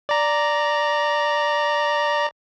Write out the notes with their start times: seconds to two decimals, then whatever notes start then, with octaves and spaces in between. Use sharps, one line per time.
0.09 D5 A#5